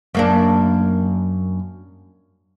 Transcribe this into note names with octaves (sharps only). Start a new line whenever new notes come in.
F#2 A#3 D4